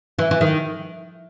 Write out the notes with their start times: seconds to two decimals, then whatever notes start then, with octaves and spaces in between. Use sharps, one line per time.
0.19 E3
0.31 E3
0.41 D#3